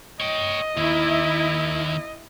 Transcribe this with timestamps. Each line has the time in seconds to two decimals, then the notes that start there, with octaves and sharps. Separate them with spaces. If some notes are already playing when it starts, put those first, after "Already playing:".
0.21 C#5 D#5 G5
0.77 D#2 D#3 E4